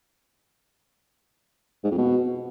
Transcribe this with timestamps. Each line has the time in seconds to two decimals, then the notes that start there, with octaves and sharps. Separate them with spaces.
1.84 G#2
1.91 F2
1.98 B2